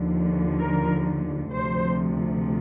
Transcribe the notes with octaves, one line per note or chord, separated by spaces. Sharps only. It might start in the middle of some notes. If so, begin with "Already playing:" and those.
Already playing: D#2 D3 F3
A#4
D2 C3 F3 C5